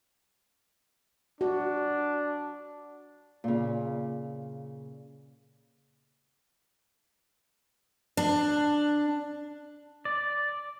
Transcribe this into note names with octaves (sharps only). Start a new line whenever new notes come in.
D4 F#4
A#2 C#3
D4
D5